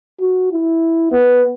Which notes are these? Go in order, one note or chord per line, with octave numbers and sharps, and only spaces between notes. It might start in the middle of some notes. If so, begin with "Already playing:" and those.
F#4
E4
B3